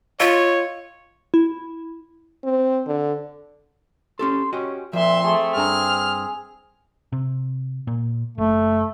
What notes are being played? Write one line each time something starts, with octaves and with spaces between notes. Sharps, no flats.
F4 C#5 D#5 F5 E6
E4
C4
D3
C#4 G4 A4 C6
C#4 F#4 G4 D#5
A#2 F3 C4 E5 C6
A3 G#4
G2 D4 G#4 A#5 F6
C3
A#2
F#1 A3